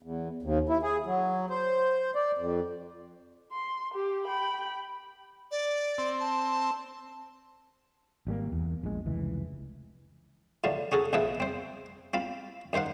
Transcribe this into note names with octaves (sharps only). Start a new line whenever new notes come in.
E2
D#2
E4
G#4
F#3
C5
D5
F2
C6
G4
G5 B5
D5
C4
A5
G#1 G3 A#3
E2
A#1 G#3
F1 C#2 E3
A2 D3 F3 F#3
C#4 F#4 G#4 A4
A#1 B2 F3 G#4 B4 E5
C4 C5
C4 F4 B5
F#2 D#3 C5 F5 F#5